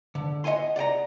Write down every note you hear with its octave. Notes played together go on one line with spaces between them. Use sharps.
D3
D#5 F5 F#5 G#5 C6
D5 F#5 G5 A#5